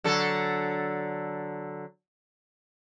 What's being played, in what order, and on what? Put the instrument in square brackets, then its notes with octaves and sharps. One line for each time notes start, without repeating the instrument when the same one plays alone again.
[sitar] D3 F#3 A4